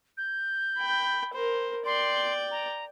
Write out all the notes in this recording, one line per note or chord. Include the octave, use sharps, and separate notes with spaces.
G6
G5 B5
A#4 C5
D5 G5 C6
A#5